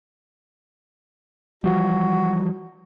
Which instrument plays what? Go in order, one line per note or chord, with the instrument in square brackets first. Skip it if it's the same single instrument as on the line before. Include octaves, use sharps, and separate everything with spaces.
[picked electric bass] E3 F3 G3 [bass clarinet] F#4